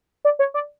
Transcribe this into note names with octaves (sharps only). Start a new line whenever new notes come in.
D5
C#5
D5